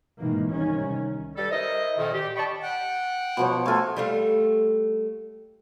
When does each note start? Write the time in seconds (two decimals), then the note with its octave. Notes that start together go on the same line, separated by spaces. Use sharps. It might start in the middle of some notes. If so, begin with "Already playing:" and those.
0.18 G#2 B2 D#3 E3 A#3
0.49 C2 C3 D#3 C#4
1.36 G3 A4
1.51 E4 A#4 C5 D#5
1.98 F2 A#2 D#3
2.14 G4
2.36 D5 D#5 G5 A5 B5 C#6
2.63 F#5 G5
3.37 B2 F3 C#5
3.66 A3 F4 F#4 G#5
3.97 G3 A3 F4